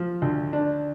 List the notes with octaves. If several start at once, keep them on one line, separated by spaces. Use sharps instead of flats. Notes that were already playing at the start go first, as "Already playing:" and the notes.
Already playing: F3
D2
D4